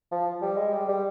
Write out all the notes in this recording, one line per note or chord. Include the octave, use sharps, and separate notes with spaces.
F3
G3
G#3
G3
G3